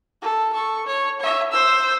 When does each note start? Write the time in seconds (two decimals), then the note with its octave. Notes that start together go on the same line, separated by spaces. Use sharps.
0.22 A4
0.53 A4 C#6
0.86 C#5
1.20 C#5 E5
1.52 C5 E6